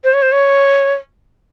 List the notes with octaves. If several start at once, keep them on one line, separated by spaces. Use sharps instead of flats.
C5
C#5
C5
C#5